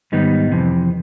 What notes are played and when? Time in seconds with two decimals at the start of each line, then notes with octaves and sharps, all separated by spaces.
0.12 G#2 D#3 G3 B3 D#4
0.52 F2 C3 E3